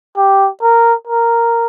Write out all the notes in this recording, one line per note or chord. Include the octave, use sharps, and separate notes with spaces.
G4
A#4
A#4